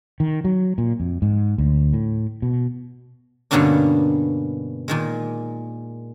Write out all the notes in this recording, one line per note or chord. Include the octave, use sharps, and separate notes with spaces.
D#3
F#3
A#2
F2
G#2
D2
A2
B2
G2 B2 D3 A#3 C#4 D4
A#2 D#3 G#3